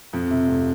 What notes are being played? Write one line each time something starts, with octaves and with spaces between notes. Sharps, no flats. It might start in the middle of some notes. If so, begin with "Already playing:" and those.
F2
C3
F1